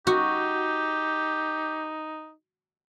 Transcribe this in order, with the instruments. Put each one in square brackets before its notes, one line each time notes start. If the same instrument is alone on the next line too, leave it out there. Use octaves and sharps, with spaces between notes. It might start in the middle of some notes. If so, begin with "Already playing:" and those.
[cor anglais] D#4 [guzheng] F#4 [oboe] G4